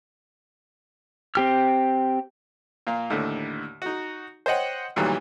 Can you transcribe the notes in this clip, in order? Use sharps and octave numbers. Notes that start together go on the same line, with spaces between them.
C4 G4 F6
A#2 A#3 F5
D#2 A2 D3
D#4 F#4
C5 C#5 D#5 F#5 G5
D2 A#2 D#3 E3 F#3 G3